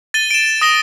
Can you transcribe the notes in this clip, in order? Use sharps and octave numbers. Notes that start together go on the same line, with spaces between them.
A6 D#7 G7
D7 E7
D#6 A#6 G7